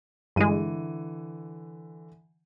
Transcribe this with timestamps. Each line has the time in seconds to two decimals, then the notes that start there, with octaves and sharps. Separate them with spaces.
0.36 G2 D3 E3 G#3 D#7